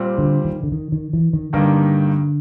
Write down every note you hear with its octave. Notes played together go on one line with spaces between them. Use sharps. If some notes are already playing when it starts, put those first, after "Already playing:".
Already playing: A#2 G3 C4
D3
D#3
D3
D#3
D#3
E3
D#3
G2 D3 D#3 G3 A#3